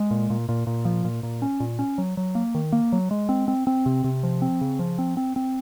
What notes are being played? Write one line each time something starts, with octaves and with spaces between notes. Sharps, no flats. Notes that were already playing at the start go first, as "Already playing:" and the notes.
Already playing: G#3
A#2
A#2
A#2
A#2
F3
A#2
A#2
C#4
A#2
C#4
F#3
F#3
A#3
D#3
A#3
F#3
G#3
C4
C4
C4
C3
C3
F3
C4
C#3
F3
C4
C4
C4